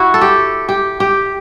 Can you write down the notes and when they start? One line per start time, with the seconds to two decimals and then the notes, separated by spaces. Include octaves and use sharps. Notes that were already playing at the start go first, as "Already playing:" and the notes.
Already playing: E4 F#4
0.14 A4
0.21 G4
0.69 G4
1.00 G4